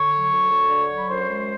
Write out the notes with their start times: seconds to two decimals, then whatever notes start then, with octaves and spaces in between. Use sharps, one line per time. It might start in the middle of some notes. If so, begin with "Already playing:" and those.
Already playing: D3 C#5 C#6
0.11 F#3
0.31 D2
0.50 D2
0.70 D3
0.90 F#3
0.98 B5
1.09 F#2 C5 C6
1.29 G#3